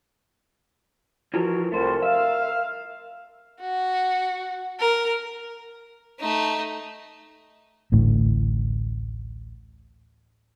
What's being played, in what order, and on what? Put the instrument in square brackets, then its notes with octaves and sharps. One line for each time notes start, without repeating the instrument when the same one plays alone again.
[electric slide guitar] E3 F3 A#4 [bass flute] F#4
[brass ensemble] C2 [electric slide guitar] A3 C5 [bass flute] A#4
[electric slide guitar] E5 [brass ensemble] F5
[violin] F#4
A#4
[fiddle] A3 D#4
[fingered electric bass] A1 D2 A2